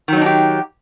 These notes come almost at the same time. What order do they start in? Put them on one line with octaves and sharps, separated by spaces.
D#3 F#3 D#4 D4 G4